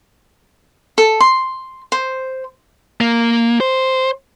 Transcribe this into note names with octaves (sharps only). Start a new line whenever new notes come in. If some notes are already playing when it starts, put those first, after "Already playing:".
A4
C6
C5
A#3
C5